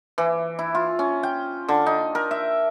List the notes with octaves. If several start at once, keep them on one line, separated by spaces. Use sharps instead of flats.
E3
E4
F4
C#4
G5
D3
D#4
A#4
E5